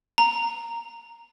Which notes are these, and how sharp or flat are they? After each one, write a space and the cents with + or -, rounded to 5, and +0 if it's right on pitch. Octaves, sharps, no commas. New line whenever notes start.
A#5 -5